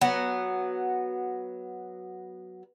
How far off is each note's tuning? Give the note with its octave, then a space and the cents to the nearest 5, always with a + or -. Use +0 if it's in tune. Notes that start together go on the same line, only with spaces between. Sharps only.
F#3 +0 B3 -10